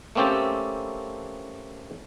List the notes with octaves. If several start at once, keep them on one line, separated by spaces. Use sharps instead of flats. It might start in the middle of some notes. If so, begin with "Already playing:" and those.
A3 A#3 C4 C#4 G4 A4